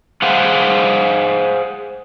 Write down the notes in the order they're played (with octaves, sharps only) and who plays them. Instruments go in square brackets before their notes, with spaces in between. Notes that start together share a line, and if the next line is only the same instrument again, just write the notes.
[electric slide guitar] G#4 C5 F5 F#5